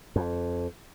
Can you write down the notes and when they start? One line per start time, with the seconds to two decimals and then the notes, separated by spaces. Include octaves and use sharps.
0.16 F2